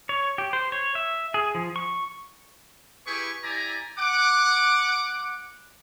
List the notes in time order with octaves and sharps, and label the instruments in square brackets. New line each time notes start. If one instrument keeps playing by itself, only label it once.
[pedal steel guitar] C#5
G4
C5
C#5
E5
G#4
F3
C#6
[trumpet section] E4 G4 G#4 B4 G#5 C#6
E4 G4 D5 G#5 A#5
F#5 D6